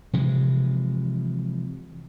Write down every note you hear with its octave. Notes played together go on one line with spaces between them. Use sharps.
C3 E3 F3 G#3